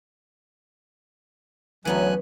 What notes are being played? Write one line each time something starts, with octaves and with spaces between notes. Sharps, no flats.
D2 E3 F#3 B3 C#4 G#5 F#6